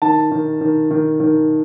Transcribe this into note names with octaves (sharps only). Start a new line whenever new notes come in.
D#3 A5
D#3
D#3
D#3
D#3